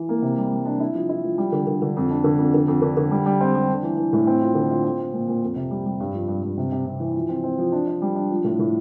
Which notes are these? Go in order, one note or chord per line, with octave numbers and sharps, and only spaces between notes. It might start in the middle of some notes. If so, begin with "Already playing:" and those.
Already playing: E3
A#3
C3
G3
G3
D4
E4
F3
E4
F3
G3
D3
D3
D3
F2
D4
D3
F2
D3
F2
D3
D3
G3
G3
C4
G3
D4
E3
E3
A2
C4
F4
D3
F4
C4
C4
A#2
A#2
F2
C3
G3
G3
G2
F3
G2
G2
C3
C3
C3
E3
F3
C4
C4
F3
D4
D4
G3
D4
F3
A2
A2